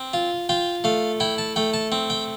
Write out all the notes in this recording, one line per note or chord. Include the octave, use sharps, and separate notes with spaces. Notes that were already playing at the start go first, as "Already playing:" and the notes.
Already playing: C4
F4
F4 G5
A3 F5
E4 G5
A5
A3 G5
A5
C4
G5